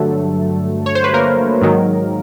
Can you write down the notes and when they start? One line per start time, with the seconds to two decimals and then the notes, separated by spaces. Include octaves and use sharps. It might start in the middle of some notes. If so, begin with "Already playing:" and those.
Already playing: G2 D3 F#3 A3 A4
0.86 C#5
0.95 C5
1.04 B4
1.14 A#3 A#4
1.61 G#2 D#3 F#3